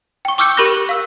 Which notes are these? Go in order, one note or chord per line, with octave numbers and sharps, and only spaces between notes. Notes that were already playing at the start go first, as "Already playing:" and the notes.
G5 C#6
C#6 D6 E6 F6 G6 C#7
G4 A#4 B5 C#6 F#6 A#6
F5 E6